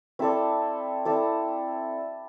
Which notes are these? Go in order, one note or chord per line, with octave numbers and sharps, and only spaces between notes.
C4 E4 A4 D5
C4 E4 A4 D5